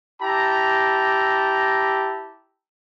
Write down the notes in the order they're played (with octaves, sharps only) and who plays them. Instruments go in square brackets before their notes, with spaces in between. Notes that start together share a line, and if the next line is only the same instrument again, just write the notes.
[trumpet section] E4 G4 A5 A#5